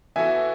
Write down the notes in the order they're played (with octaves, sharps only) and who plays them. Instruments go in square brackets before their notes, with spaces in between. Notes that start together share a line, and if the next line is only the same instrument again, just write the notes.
[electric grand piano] E3 B3 F#4 A4 [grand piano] E5 G#5